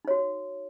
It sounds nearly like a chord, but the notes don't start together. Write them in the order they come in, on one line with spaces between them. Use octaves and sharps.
D#4 C#5 F#4